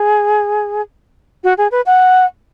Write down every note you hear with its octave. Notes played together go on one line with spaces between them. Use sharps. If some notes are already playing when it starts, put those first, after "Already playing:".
Already playing: G#4
F#4
G#4
B4
F#5